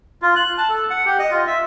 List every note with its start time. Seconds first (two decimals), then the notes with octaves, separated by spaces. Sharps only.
0.22 F4
0.36 F#6
0.58 A5
0.69 A4
0.90 F#5
1.06 G4
1.19 D#5
1.31 F4
1.47 E5